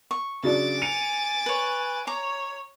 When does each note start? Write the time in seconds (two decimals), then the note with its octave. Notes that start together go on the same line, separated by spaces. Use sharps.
0.11 C#6
0.43 C#3 F#3 D4 D6 A6
0.82 G#5 C#7 D#7 F7
1.46 B4 C#5
2.07 C#5 A#5 D6